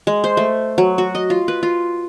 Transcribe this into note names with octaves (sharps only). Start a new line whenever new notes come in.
G#3
C5
A3
F#3
F#4
D#5
F4
B4
F4